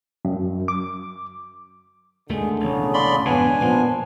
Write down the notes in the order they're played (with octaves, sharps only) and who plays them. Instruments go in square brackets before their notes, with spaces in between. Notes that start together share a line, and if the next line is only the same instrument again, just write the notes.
[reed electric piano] F#2
D6
[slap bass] D#2 D#3 A3 [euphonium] D3 [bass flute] G#3
[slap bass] E1 A1 [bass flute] C#3
[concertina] D5 B5 C6
[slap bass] G#1 F2 B2 [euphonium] B3 [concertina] D4 G#5
[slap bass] A#2 A#3 [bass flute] F3 [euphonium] B3